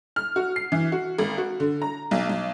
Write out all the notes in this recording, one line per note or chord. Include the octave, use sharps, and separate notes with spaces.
F6
F#4
C7
E3
F#4
G#1
F#4
D3
A#5
B1
B1